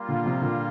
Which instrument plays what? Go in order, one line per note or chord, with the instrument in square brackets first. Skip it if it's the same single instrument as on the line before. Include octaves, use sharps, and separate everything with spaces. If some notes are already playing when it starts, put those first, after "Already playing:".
Already playing: [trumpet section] G3 A#3 F4
[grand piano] A#2 D3
C3 F3
A#2 D3